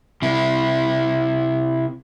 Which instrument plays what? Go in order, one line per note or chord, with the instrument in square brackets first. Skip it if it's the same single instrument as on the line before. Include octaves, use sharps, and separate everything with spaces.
[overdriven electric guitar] C3 E4